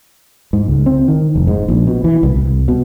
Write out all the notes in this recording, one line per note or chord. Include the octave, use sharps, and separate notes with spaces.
G#2
C#2
C4
D#3
F1
G#2
A#1
B2
E3
C2
C2
B2